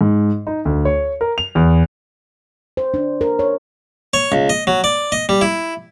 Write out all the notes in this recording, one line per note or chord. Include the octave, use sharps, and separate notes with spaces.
G#2
D#4
D2
C#5
A#4
F7
E2
C5
D4
A#4
C#5
C#5
C#2
D#5
F#3
D5
D#5
G3
E4